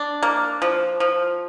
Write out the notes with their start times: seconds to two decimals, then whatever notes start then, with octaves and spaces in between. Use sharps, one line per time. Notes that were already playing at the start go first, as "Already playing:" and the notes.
Already playing: D4
0.23 A#3
0.62 F3
1.00 F3